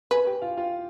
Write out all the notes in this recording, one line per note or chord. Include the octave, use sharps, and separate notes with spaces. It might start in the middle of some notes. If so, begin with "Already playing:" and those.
G#4 B4 G#5
G4 G5
F4 F5
F4 F5